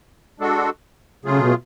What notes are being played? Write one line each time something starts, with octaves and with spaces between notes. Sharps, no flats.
G#3 D4 F#4 A4
C#3 F#3 A3 F4 G#4
B2